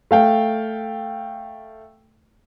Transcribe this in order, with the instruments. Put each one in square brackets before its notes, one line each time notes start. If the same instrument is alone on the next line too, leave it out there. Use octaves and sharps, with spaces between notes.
[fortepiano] A3 F5 G5